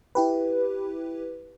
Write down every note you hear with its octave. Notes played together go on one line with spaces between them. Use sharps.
E4 G4 B4